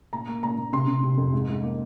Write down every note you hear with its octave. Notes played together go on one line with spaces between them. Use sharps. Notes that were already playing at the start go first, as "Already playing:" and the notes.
A#2 A#5
A#3
A#2 A#5
A#2
C3 C6
C3
C3
F2
G#2
G#2
A#3